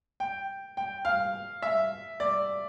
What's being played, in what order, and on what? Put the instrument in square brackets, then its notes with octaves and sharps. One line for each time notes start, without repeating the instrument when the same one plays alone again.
[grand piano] G5
G5
F5
E5
D5